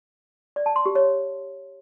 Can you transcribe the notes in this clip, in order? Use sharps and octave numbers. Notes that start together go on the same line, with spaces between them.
D5
A5
C6
G4
C#5